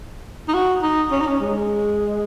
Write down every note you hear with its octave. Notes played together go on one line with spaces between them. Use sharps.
D#4
F#4
D#4
C#4
D#4
C#4
G#3